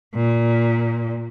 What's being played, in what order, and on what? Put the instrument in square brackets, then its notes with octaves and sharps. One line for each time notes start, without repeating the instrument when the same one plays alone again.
[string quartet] A#2